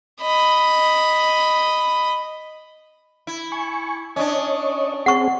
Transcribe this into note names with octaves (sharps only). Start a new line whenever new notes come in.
D#5 B5
E4
G#5 C#6
C#4 D4 C#5 D#5
C4 G#4 F#5 C#6